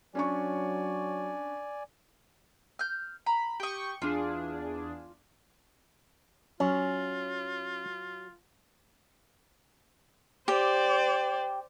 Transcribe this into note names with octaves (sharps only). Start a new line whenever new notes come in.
F#3 C#4 D4 D5 G#5 C#6
F6 G6
A#5 B5
G4 G5 C#6 D#6
E2 D4 F4 G#4
F#3 C#4 F4
G4 C5 D5